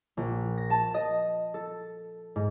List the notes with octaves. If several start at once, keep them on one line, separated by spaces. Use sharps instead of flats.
A#1
A#6
A5
D#5
A4
G#2